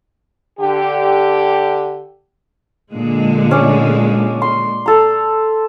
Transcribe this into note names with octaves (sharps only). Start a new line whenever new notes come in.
D3 G4
A#2 D3 G#3
C#4 D5
C6
A4 A#5